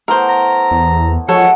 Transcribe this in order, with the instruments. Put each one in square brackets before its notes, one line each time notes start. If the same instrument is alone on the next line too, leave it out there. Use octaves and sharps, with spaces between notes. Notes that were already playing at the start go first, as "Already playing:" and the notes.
[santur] A3 B3 E4 [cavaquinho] A#4 C5
[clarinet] A#5
[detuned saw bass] E2
[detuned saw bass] F3 [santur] G#3 F#4 F#5 [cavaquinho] A4 [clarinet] C#5